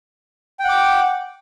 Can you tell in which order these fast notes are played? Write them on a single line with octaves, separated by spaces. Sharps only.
G5 F#5 D6